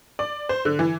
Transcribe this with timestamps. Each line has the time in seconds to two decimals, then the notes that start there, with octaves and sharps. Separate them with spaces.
0.19 D5
0.49 C5
0.65 D3
0.79 E3